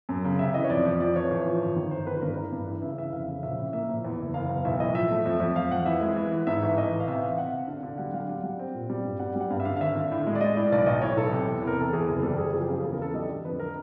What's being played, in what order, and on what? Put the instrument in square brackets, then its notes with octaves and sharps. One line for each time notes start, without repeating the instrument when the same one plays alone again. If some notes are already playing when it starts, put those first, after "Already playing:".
[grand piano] F#2
C#3
C3 E5
E3 D#5
C#5
F2 D5
F2
F3 D5
A1 C#5
A1
F3
G1
D#3
G1 C5
D#3 B4
G2 A#4
E3 A#4
G2
E3
C#3 E5
E3 E5
F1 F5
C#3
A#1 E5
A2
A#3 E5
A#1 E5
E2
F#1
F#1 F5
E2
B1 E5
A2 D#5
F3 E5
A3
F2
F2
F2 F5
F2 F#5
E3 E5
G#3
E3
E3
G#2 E5
A1 E5
A1 D#5
A1
F5
C3 E5
C3 F5
C3 F#5
C3
D3 F5
D3
G3 F#5
G3 F5
G3 F#5
G3
C4
A#2
G3
G2
G3 F#5
G3 F#5
G2 F5
E5
D3 F5
F5
G#1 E5
D3
A2
G#3
D5
G#3 D#5
A2 D5
B1 D5
B1 D#5
A2 C#5
B1 A4
C3
E2
E2
A#4
C3 A4
E2 G#4
F#1
G3 A4
F#1 G#4
F3 G#4
G4
C#3 G#4
E2 A4
A#4
E2 A4
G3 D#5
D3
F2 B4
D3 A#4